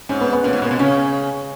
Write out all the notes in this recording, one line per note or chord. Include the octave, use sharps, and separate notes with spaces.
G#2 C#4
B3
B3
A#2 C#4
G#2
A#2
B2
C#3 C#4